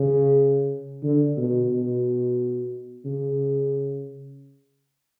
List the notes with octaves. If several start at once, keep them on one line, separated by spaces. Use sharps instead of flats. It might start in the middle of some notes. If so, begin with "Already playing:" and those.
Already playing: C#3
D3
B2
B2
C#3